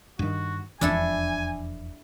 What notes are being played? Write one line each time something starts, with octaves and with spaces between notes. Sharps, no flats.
G2 D#3 F#4
E1 F2 E3 D4 E4 A4 G#5